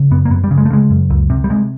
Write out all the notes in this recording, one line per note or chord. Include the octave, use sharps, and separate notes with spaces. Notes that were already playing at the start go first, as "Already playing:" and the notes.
Already playing: C#3
F#2 B3
A#3
F#2 B3
G3
C#3
G#3
A3
C#3 G#3
F#2
C#2
C3
G3
C3 G#3